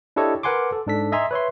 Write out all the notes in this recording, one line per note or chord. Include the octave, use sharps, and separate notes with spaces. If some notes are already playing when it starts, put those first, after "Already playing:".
D4 E4 G4 A4 C#5 D#5
A#4 B4 F#5 G#5 C6 D6
A4
G#2 D4 A4 B6
D#5 E5 G#5 A#5 C6
B4 C#5 E5 C6